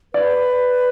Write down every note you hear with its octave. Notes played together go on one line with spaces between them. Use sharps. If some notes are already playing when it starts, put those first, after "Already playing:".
B4 D5